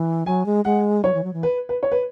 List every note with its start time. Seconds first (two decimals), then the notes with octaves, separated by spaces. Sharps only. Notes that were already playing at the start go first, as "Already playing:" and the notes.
Already playing: E3
0.26 F#3 G#5
0.46 G#3
0.65 G#3 F#5
1.04 F#3 C#5
1.14 E3
1.24 F#3
1.33 E3
1.43 B4
1.69 B4
1.83 C#5
1.92 B4